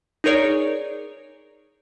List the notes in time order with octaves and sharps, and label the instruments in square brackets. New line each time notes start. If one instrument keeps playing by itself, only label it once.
[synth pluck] D#4 G#4 A#4 C#5 D5